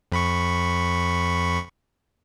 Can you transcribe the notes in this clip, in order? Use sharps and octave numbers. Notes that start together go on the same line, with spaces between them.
F2 B5 C#6